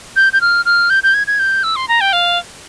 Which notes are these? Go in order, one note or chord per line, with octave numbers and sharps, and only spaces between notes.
G6
G6
F6
F6
G6
G6
G#6
G#6
G6
E6
C6
A#5
G5
F5